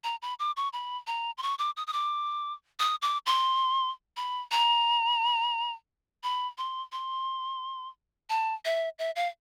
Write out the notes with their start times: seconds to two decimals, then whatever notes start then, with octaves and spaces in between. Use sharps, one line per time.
0.04 A#5
0.22 B5
0.39 D6
0.57 C#6
0.73 B5
1.07 A#5
1.38 C6
1.43 C#6
1.59 D6
1.77 D#6
1.87 D#6
1.93 D6
2.79 D#6
3.02 D6
3.26 C6
4.17 B5
4.51 A#5
6.23 B5
6.58 C6
6.92 C6
8.30 A5
8.65 E5
8.99 E5
9.16 F5